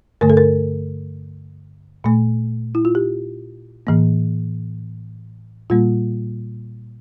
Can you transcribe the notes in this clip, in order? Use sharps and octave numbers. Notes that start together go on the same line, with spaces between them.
G2 D3 A3 A#4
A4
A#4
A#2 A3
E4
F4
G4
A2 E3 A#3
A#2 G3 A#3 F4